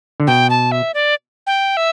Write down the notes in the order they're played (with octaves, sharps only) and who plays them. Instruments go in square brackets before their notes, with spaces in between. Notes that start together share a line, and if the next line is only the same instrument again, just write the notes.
[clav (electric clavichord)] D3
[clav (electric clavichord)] B2 [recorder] G5
[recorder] A5
E5
D5
G5
E5